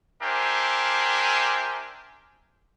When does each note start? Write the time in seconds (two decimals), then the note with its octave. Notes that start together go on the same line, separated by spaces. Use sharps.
0.22 D4 G4 A#4 C5 E5 G#5